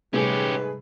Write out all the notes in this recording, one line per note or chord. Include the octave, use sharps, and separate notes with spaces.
G#2 C3 G3 A3 C#4 G4 G#4 B4